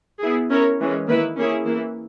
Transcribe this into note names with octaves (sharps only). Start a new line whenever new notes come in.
B3 E4 G#4
C#4 E4 A#4 C#5
E3 G#3 C#4
D#3 A#3 E4 B4
A#3 C#4 E4 G#4 C#5
E3 A#3 E4